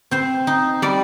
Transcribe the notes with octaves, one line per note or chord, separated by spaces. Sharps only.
C4 C5
D#4
G3 D5